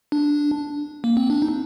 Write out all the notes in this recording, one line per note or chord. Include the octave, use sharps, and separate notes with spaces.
D4
A#3
C4
D4
D#4